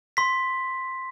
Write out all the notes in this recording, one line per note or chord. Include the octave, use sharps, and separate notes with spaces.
C6 B6